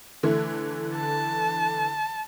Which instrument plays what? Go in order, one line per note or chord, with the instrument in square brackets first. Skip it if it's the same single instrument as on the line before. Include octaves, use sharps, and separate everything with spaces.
[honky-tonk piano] D3 E3 A3
[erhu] A5